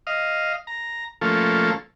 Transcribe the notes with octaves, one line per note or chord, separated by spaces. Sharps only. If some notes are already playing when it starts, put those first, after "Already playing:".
D#5 F5
A#5
F3 A3 A#3 C#4 F4 A4